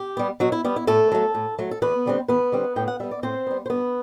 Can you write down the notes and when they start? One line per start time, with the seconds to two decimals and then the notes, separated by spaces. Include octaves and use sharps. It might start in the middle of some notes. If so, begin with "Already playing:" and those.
Already playing: G4
0.17 G3 B3
0.40 B2 F#3 F#4
0.52 E4
0.65 G3 B3
0.76 E4
0.87 A2 A3 A4
1.12 F#3 A3
1.35 A2
1.59 F#3 A3
1.71 A4
1.82 E2 B3 B4
2.06 D3 G3 C4
2.28 E2 B3 B4
2.52 D3 G3 C4
2.76 A2 G5
2.88 F#5
3.00 G3 B3 E5
3.11 D5
3.23 A2 C4 C5
3.47 G3 B3
3.66 C5
3.70 G2 B3 B4